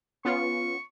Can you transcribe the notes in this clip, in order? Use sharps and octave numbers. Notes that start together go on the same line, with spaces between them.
B3 C#4 F4 C#6